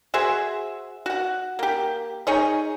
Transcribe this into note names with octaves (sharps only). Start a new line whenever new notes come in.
F#4 G#4 C5 E5
F#4 F#5
A#3 G4
D#4 G#4 C#5 D#5